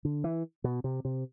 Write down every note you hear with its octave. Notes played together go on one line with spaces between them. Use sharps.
D3
E3
B2
C3
C3